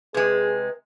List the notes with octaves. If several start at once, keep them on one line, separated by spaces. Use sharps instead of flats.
C3 G#3 G#4 B4